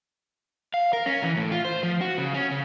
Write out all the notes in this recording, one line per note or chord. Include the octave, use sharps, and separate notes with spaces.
F5
A#4
C#4
E3
A2
F4
C5
F3
F#4
C#3
C#4
C#3